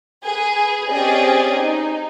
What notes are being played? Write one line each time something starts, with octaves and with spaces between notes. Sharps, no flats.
G#4 B4
C4 C#4 G4 G#4 D5 D#5
D#4